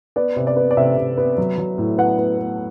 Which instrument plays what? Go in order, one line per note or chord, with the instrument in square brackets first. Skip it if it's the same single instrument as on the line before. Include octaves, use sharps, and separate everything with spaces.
[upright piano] B3 D5
C3
D5
B3
D5
C3 E5
C3
B3
F#3
F#3
A2
B3 F#5
B3
B3